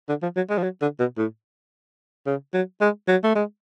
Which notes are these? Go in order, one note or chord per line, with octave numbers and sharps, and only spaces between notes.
D3
F3
F#3
G#3
F3
F#3
D3
B2
A2
C#3
F#3
G#3
F#3
A3
G#3